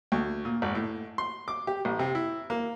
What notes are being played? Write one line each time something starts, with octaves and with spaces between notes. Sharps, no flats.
D2
A#2
G#1
A2
C6
D6
G4
A1
C3
E4
A#3